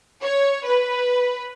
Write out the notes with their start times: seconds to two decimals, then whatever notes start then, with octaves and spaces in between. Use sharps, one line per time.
0.24 C#5
0.66 B4